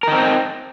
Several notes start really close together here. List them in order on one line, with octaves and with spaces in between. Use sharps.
A#4 D#4 C4